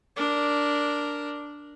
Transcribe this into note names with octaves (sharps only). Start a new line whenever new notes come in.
D4 A#4